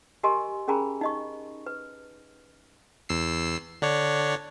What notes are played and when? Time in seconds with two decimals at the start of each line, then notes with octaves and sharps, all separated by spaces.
0.23 G4 A#4 D#5 G#5 C6 C#6
0.68 C#4 G#4 A#4 G#5 A#5 B5
1.01 D#4 D#5 C#6
1.66 B4
3.09 E2 E6 C7
3.82 D3 D4 C#5